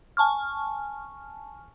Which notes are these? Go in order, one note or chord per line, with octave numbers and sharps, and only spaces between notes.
G#5 A5 C#6 F6